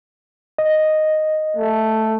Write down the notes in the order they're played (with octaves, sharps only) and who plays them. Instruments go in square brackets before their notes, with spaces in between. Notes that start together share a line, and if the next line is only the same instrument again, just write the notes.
[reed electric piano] D#5
[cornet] A3